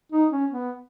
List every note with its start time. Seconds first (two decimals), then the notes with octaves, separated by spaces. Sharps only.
0.12 D#4
0.32 C#4
0.50 B3